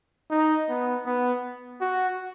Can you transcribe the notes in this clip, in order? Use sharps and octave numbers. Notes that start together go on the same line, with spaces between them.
D#4
B3
B3
F#4